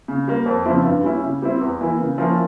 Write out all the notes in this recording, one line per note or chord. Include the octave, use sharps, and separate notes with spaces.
C#3
G3 A#3
F2
C#3 F3 C4 E4
G2
G3 C#4 E4
C#3
G3 C4 E4
E2
E3 A#3 E4
C#3
F3 A#3 C#4 E4